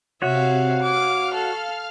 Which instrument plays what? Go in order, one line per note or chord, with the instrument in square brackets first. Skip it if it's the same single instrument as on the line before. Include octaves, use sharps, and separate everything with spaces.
[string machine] C3 F5 [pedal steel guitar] F#4 C#5 [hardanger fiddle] E5
[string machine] F5 F6 [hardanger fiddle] D6
[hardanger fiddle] A4